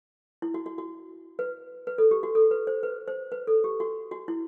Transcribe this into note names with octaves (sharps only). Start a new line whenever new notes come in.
E4
F#4
F#4
F#4
B4
B4
A4
G4
F#4
A4
B4
C5
B4
C5
B4
A4
G4
F#4
F#4
E4